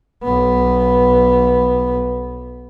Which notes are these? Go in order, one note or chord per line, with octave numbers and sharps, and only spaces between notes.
B1 B3